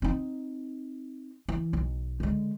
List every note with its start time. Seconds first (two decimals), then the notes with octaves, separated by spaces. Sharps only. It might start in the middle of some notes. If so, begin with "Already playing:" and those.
0.02 C4 D#4
1.48 E3
1.73 B1
2.20 D3 G#3